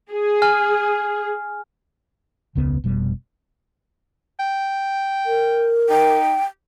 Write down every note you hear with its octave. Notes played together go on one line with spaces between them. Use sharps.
G#4
G#5 F6
E1 C#2 C#3 B3
F1 B2 G3
G5
A#4
D#4 G5